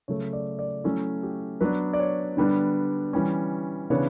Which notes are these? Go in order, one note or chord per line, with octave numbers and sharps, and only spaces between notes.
C#3 F#3 A3 C#5
D5
D5
F#3 A3 C#4 E4 A4
G4
F#3 B3 D4 B4
D5
C#5
D3 G3 B3 D4
E3 G3 C#4
C#3 E3 B3 D4 C#5